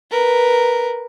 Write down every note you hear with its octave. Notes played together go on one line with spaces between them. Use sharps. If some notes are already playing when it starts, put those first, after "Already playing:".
A#4 B4